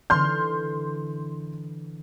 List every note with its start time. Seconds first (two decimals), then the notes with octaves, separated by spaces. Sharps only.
0.10 D3 E3 C6 F6 G6